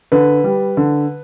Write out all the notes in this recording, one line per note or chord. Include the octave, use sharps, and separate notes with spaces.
D3 B4
G3
D3